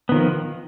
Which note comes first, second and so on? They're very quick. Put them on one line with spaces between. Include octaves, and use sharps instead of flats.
B3 D#3 F3